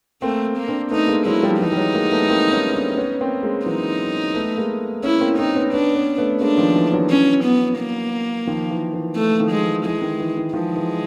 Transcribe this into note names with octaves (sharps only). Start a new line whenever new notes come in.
A3 A#3 C4
A#3
C4 D4
A3 B3 D#4
G#3 A#3
F#3 G#3 E4
F3 G3
E3 F#3 D#4
G3
F#3 G#3
G#3 A#3
A3 B3
A#3 C4
B3 C#4
C4 D4
B3 C#4
A#3 C4
G#3 A#3
E3 F#3 D#4
A3 B3
G#3 A#3
B3 C#4 E4
A#3 C4
A#3 C4 D#4
B3 C#4
B3 C#4 D4
B3 C#4
A3 B3
G#3 A#3 D4
D#3 F3
E3
E3 F#3
C#4
B3
A#3
D#3 F3
E3
E3
A3
D#3 F3
G#3
E3
E3 G#3
D#3
E3
D#3
D#3 F3 G#3
E3